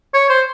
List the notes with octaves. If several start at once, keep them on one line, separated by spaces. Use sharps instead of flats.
C#5
C5